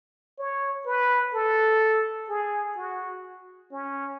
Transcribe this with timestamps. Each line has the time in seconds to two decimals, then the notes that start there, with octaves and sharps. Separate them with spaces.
0.38 C#5
0.86 B4
1.34 A4
2.29 G#4
2.77 F#4
3.72 C#4